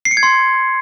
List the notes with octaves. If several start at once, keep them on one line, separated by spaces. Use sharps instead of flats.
C7
C#7
G#6
C6